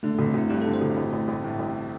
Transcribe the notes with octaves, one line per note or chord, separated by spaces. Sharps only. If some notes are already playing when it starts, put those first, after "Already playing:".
D3 A3
A3
G1
C4
G1 E4
G2 G4
A4
D3
C5
G1
A1
A1
A1
A2
A1